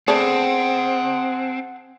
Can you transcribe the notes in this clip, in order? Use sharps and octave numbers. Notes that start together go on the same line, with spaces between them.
A3 B3 C4 D4 G#4 F#5 A5